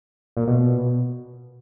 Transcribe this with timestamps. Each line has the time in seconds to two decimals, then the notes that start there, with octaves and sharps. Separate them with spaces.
0.37 A#2
0.47 B2